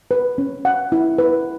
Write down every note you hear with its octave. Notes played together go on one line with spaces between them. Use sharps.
B4
C#4
F#5
E4
B4